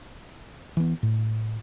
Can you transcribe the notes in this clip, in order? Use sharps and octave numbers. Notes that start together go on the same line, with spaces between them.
E3 B3
A2